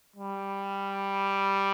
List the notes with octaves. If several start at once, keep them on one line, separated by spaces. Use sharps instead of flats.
G3